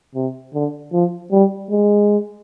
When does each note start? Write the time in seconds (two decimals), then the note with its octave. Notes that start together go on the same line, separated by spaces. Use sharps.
0.15 C3
0.54 D3
0.93 F3
1.32 G3
1.71 G#3